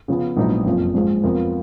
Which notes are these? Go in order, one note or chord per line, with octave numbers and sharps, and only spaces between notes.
C#3 F3 B3
A#1 G#2 F#3 B3 D#4
F#1 F2 F3
G#2 F3 G#3
F2 F3 B3 F4 A#4